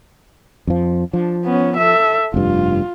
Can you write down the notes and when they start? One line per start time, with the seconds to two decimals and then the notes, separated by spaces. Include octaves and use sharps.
0.67 F2 F3
1.13 F3 D4
1.45 B3 C#4
1.77 A4 E5
2.34 F1 G2 F4